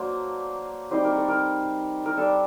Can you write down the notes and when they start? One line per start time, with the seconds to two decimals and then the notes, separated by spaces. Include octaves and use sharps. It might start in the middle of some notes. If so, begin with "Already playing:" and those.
Already playing: F#3 A#3 D4 C5
0.91 G3 C4 D#4 C5
1.04 A#4
1.16 A4
1.28 A#4
2.06 A#4
2.17 G3 D4 A4